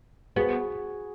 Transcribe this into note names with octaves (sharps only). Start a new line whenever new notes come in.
B3 F#4 G#4